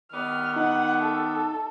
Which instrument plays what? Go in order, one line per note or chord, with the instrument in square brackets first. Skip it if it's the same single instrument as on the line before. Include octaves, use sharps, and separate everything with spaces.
[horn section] D#3 G3 B3 [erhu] F6
[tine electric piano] D#4 [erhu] F#5
[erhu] A4